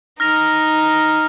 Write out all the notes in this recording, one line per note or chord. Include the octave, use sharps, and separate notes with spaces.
D#4 F6 A#6 F7